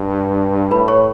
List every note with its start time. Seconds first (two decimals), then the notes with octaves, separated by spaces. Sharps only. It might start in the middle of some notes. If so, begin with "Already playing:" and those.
Already playing: G2
0.71 A2 B4 B5
0.88 C#5 C#6